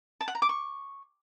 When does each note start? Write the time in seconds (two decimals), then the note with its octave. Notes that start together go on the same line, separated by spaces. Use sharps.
0.21 A5
0.28 F#5
0.35 A#5
0.42 D6
0.49 C#6